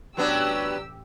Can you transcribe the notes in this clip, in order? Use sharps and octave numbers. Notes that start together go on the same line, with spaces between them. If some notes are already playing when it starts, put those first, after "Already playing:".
A1 F#3 B3 D4 G4 E6